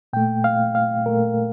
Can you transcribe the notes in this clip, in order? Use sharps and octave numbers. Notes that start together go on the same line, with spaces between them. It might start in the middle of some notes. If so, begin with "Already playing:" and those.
A#2 A3 G5
F5
F5
A#2 A3 A#4